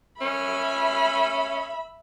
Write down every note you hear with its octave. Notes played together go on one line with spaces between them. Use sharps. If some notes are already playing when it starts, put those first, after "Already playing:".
C#4 E5 B5